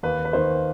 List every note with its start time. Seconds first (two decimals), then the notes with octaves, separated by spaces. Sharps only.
0.03 D#2 B4
0.25 B4
0.33 D#3 C5